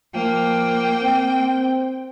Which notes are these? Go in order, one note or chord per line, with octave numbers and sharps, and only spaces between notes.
F3 A#3 G5
C4